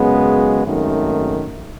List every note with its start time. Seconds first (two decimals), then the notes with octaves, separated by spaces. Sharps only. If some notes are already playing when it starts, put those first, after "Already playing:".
Already playing: F#2 C#3 G#3 B3
0.63 G#1 F#2 D#3 A3